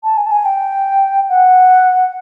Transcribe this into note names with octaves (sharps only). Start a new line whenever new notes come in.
A5
G#5
A5
G#5
G5
F#5